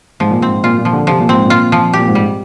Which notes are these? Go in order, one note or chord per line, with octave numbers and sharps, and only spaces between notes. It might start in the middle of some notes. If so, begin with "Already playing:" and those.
G#2 F3
A#2
G#2 C4
A#2 F4
A#2
F3
D3
C3 F3
A#2
G#2 C4
A#2 F4
F3
A#2 G4
G#2
G3